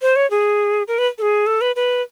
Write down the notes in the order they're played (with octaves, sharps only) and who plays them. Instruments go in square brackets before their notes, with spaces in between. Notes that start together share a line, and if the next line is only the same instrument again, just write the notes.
[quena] C5
C#5
G#4
A#4
B4
A4
G#4
A4
B4
B4